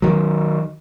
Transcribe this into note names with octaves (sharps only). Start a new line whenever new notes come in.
D#3 F#3